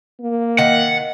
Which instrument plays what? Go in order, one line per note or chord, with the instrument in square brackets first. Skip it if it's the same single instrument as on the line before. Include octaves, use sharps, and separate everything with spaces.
[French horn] A#3
[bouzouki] D#3 [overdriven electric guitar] F#5